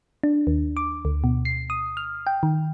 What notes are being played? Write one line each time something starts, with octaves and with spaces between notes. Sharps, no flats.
D4
D#2
D6
D2
B2
C7
D#6
F6
G5
D#3